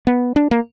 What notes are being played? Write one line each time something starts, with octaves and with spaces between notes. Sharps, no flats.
B3
D4
A#3